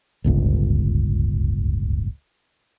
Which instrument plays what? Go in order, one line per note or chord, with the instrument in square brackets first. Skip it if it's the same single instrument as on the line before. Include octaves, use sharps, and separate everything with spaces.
[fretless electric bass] D1 G1 C#2